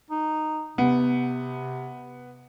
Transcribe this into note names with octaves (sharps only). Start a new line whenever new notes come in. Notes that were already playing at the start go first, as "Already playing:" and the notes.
D#4
C3 B3